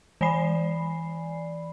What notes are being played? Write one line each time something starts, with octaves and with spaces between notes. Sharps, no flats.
E3 D5 G#5 B5 C7